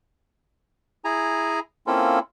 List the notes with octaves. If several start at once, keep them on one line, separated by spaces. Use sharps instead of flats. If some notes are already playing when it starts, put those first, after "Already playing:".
E4 G#4 G#5 A#5
A#3 C4 C#4 E4 F4 A4